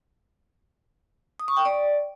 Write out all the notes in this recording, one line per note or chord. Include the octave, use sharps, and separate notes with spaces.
D#6
C#6
G5
D5